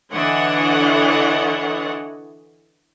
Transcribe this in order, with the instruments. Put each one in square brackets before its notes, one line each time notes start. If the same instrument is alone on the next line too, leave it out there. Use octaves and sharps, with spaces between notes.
[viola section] D3 E3 D4 C#5 D#5 F#5